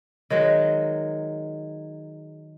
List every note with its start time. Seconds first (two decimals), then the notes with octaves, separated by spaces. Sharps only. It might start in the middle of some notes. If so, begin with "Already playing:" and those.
0.30 D#3 F#3 G#3